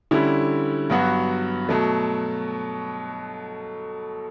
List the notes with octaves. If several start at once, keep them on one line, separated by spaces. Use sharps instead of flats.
D3 G3 C#4 E4
G2 F#3 B3 F#4
B2 F#3 A3